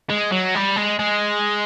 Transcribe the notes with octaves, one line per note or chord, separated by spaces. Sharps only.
G#3
F#3
G3
G#3
G#3